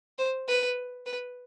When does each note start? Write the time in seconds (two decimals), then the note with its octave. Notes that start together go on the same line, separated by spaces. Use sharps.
0.18 C5
0.48 B4
1.06 B4